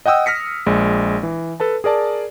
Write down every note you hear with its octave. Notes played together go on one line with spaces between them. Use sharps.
D#5 F#5 G5 D#6 E6
F6 A#6 B6 C#7
A#1 G#3
E3
A4 B4 A5
G#4 A#4 D5 A5